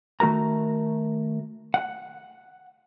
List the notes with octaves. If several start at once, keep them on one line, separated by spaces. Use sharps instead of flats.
D#3 A3 F#4 A#4 A#5
F#5